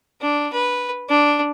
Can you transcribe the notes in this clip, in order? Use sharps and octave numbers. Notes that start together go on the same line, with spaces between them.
D4
B4
D4